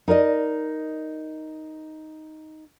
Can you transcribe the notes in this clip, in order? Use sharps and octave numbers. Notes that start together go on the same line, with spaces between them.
D#4 A#4 D5 D#5